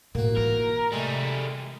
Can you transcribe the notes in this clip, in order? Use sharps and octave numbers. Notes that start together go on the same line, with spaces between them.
A2 A#3 F#4
E3 F4 A#4
G#2 C3 G3 A3 G#4